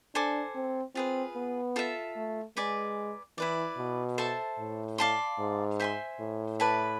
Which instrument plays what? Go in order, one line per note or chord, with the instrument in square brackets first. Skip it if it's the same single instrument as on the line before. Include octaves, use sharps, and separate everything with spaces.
[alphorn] D4 [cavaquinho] A4 C5 G#5 D6
[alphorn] C4
[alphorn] C4 [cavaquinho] F4 G#4 B4
[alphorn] B3
[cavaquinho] F4 A4 E5
[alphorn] A3
[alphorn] G#3 [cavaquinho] B4 D5 G#5
[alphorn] E3 [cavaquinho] E4 B4 D5
[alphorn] B2
[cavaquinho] A4 C5 E5 A5
[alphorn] A2
[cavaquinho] D5 F5 A5 C6
[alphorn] G#2
[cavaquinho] C5 E5 G#5 C6
[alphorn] A2
[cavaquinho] E4 B4 D5 A5